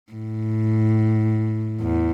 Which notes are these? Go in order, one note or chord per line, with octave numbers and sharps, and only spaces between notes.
A2
E2